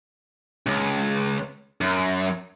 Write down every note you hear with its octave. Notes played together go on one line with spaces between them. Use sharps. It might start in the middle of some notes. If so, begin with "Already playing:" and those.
C#2
F#2